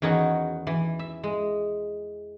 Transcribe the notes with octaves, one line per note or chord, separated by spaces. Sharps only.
E2 D#3 C#4 D#4 F#4
E3
E5
G#3